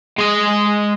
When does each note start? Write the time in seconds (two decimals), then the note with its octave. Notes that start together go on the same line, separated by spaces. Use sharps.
0.18 G#3 D#5